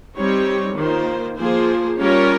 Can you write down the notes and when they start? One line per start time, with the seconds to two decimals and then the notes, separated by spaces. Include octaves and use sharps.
0.16 G3 C4 D#4 G4 C#5
0.77 D#3 A#3 F4 C5
1.37 F3 A#3 F4 G#4 C5
1.98 G3 C#4 F4 A#4 C#5